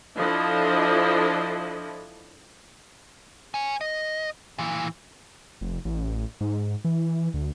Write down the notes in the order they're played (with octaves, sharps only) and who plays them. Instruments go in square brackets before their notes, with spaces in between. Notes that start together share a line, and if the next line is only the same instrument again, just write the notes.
[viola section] F3 D4 E4 A4 D#5
[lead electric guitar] C#5 G#5
D#5
A#2 E3
[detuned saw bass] F1
A1
G#2
E3
D2